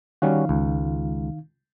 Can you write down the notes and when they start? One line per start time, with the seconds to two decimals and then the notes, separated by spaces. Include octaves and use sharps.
0.22 D#3 G3 C#4 D#4 F#4 F5
0.49 C#2